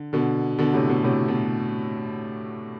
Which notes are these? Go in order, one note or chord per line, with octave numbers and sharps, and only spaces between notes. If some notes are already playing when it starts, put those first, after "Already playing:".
Already playing: D3
B2 D3
B2 D3
A2 C3
B2
A2 C3
B2